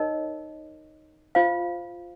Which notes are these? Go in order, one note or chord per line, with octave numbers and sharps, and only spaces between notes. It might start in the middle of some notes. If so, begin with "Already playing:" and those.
Already playing: D#4 A#4 C#5 D#5
F4 C5 F5